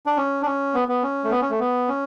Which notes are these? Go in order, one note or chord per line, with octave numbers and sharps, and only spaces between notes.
D4
C#4
D4
C#4
B3
B3
C#4
A3
B3
C#4
A3
B3
C#4